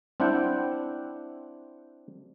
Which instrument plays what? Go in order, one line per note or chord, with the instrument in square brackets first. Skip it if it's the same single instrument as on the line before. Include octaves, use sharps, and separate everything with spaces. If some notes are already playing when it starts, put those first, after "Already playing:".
[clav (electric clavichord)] C4 D4 E4 F#5 G5